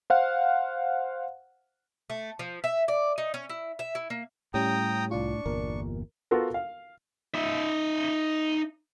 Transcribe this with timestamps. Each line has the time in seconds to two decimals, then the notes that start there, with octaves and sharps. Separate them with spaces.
0.10 C5 F5 F#5
2.10 A3
2.39 F3
2.64 E5
2.88 D5
3.18 D#4
3.34 C#4
3.50 E4
3.79 E5
3.95 E4
4.10 A#3
4.54 A2 G3 C#4 G4 G5 A#5 D#6
5.11 C2 D4 F4 C#6
5.46 G1 E2 A#2 A#4
6.31 B3 F4 F#4 A4 A#4
6.54 F5
7.34 D#4 E5